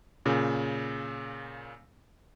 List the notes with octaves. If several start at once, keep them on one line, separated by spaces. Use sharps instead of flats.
A#2 C#3